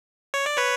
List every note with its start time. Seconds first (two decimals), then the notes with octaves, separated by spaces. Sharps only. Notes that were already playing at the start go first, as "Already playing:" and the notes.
0.34 C#5
0.46 D5
0.57 B4 C#5